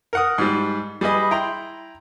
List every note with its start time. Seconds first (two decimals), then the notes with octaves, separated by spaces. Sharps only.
0.13 A#4 F#5 D#6
0.38 G#2 G3
1.01 G3 G#4 B4 D#5
1.31 E4 G5 A#5 C6